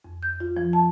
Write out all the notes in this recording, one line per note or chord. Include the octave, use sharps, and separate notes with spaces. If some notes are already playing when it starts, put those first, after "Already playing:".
F2
G6
F4
F3
A5